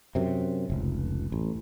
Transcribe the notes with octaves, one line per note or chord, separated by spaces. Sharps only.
F#2 C3
F1 C#2
A1